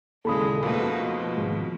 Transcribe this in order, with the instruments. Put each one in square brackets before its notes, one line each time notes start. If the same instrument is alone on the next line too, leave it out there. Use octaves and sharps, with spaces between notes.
[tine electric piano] D#2 C#3 [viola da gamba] A#2 G#3 [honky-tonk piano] E3 [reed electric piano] A4 B5 D#6
[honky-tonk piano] F2 B2 [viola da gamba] A3 D#4 B4 [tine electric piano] A#3
[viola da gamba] F3
[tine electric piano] G#1 [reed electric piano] G#3